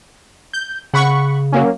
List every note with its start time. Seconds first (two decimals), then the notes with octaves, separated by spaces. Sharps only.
0.53 G6
0.94 C#3 F#5 B5 C#6
1.52 F#3 A#3 C#4